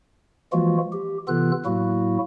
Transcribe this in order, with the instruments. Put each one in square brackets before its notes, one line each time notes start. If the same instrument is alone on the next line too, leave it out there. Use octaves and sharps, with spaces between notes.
[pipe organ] E3 F3 G#3 A#3 F4 F#4
G4
C3 E3 B3 F4 A4 F#6
A2 F#3 A#3 E4 F#4